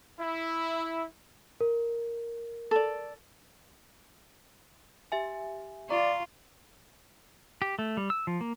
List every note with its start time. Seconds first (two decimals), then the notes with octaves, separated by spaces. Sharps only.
0.19 E4
1.61 A#4
2.71 A4 D5
5.12 G4 E5 G#5
5.90 F4 D5 A#5 C#6
7.62 G4
7.79 A3
7.97 G3
8.10 E6
8.27 F3
8.41 A#3